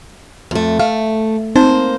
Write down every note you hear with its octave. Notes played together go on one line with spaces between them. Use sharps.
F2 A3
A3 F5
A#3 C4 D#4 C5 A5